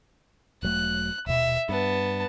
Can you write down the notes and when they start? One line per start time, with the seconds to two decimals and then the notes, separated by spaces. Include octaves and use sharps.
0.63 E1 F#3 A3 F#6
1.27 D#1 B2 E5
1.69 G2 B3 A5